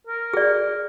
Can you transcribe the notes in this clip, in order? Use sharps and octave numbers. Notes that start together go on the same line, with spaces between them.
A#4
G#4 D5